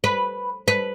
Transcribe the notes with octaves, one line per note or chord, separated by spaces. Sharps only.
B4
B4